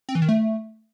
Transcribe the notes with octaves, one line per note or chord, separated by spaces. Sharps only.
C4
E3
D#3
A3